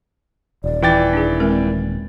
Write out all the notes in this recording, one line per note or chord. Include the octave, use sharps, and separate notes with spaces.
D#1 D5
E3 F4 G5 D6 A6
D4 G#4
G#3 C4 A#4